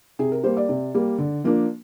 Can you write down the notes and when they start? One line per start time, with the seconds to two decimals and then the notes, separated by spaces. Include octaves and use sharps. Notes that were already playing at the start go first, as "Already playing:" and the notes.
0.19 C3 G#4
0.32 A#4
0.43 G3 A#3 C5
0.57 D5
0.69 C3
0.95 G3 A#3
1.19 D3
1.44 F3 A#3 D4